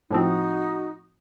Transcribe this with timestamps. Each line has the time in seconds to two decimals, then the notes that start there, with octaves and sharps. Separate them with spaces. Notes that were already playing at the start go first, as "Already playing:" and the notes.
0.11 A2 F3 C4 D#4 F#4 D#6